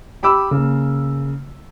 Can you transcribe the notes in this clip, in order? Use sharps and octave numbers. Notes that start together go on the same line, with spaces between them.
G4 B5 D6 E6
C#3 A#3